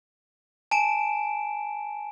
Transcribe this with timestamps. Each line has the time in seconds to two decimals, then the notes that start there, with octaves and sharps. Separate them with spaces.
0.71 G#5 A5 D7 E7